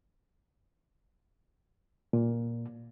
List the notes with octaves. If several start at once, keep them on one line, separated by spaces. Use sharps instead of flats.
A#2